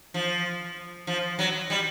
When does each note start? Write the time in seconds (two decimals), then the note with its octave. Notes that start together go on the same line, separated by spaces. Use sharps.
0.14 F3
1.07 F3
1.39 F#3
1.70 G3